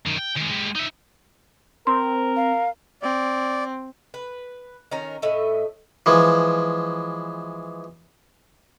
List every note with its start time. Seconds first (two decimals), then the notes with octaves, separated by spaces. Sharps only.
0.06 F#2 D#3
0.18 G5
0.36 D#3 G#3
0.49 G#3 G4
0.75 D#4 E5
1.87 C4 A#4 C6
2.36 F5
3.02 C4 D5
4.14 B4
4.91 D#3 C#4 A#4
5.22 A2 A3 D#5 E5
6.06 E3 F3 G#3